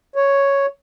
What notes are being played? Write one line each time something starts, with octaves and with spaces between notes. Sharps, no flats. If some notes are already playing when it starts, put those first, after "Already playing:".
C#5